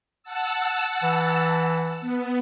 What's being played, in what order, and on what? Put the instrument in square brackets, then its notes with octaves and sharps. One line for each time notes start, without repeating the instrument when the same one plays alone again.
[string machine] F#5 A5 E6
[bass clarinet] E3
[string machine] B3